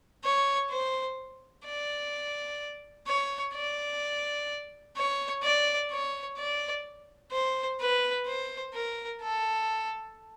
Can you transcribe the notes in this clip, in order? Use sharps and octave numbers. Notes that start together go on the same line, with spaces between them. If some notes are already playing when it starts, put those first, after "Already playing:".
C#5
C5
D5
C#5
D5
C#5
D5
C#5
D5
C5
B4
C5
A#4
A4